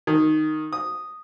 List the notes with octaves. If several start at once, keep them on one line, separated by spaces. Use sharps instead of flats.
D#3
D#6